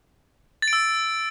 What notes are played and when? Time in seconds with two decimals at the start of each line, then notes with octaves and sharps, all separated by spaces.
0.62 A6
0.68 D7
0.73 E6